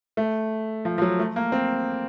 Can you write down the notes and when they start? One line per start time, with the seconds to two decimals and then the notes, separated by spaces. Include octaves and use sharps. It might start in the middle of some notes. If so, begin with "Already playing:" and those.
0.17 A3
0.85 F3
0.98 F3
1.02 F#3
1.19 A3
1.36 A#3
1.52 C4